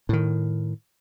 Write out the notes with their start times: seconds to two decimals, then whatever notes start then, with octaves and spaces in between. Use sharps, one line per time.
0.09 A2 D#3